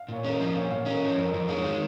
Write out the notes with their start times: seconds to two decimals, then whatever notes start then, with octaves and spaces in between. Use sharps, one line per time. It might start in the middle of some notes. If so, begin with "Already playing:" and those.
Already playing: F5
0.08 A#2 C#5
0.24 C#4 A#4 D#5
0.40 F3
0.55 A#2 C#5 F5
0.71 A#2 C#5 F5
0.86 C#4 A#4 D#5
1.02 F3 C#5
1.18 F2 A#4 D#5
1.34 F2
1.49 G#3 C#5 F5
1.65 D#3